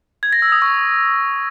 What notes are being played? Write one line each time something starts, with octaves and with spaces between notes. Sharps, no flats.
G#6
A#6
E6
D#6
C#6